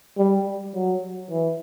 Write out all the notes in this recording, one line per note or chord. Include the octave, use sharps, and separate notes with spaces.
G3
F#3
E3